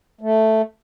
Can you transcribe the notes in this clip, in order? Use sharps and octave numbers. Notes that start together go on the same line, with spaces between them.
A3